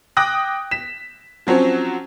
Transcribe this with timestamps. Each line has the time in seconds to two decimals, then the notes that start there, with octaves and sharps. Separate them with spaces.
0.17 G5 D6 D#6 F#6 A#6
0.71 B6 E7
1.47 F3 F#3 C4 C#4